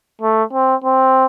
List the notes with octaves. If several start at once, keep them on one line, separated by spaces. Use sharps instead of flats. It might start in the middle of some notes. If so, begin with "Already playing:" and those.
A3
C4
C4